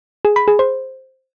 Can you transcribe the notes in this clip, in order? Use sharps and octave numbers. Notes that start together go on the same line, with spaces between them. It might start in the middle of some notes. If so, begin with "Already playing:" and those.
G#4
B5
G#4
C5